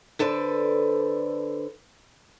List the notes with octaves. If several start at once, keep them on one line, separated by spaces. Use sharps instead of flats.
D3 A4 B4 C5 D5